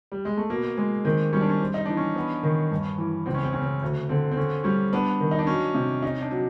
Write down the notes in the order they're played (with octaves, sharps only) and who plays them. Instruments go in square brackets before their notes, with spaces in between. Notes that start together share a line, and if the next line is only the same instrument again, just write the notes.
[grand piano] G3
G#3
A3
[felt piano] B2 [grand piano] A#3
[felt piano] G#3
[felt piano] D#3 [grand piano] C4
[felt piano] G3 [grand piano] C#4
[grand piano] D4
C#4
[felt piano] C4
[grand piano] D#4
[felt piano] E3 [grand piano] D4
[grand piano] C#4
[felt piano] B3
D#3
G2
E3
[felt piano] C#2 [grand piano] C4
[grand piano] C#4
C4
[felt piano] C#3 [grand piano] C#4
[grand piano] C4
[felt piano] D2
[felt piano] D3 [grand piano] C4
[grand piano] C4
[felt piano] D3 [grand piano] C#4
[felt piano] G3 [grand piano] C#4
[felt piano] B3 [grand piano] D4
[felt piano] D#3
[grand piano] D#4
D4
[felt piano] F#3 [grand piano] C#4
[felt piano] C3
[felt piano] C#4 [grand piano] D#4
[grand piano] D4
[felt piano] F#3